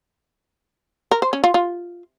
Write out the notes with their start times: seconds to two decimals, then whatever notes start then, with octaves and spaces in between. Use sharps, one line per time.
1.11 A#4
1.22 C5
1.33 C#4
1.44 F4
1.54 F4